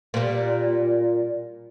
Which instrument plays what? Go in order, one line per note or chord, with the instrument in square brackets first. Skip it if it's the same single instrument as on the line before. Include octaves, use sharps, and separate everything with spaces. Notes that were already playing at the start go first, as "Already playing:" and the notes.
[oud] A#2 G3